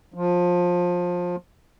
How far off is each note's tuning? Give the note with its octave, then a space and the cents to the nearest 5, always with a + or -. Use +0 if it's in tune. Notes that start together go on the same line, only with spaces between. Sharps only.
F3 +20